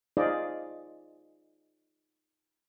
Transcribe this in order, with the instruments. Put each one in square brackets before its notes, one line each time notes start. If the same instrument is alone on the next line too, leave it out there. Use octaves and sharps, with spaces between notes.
[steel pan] D#4 F4 G#4 C5 D5 D#5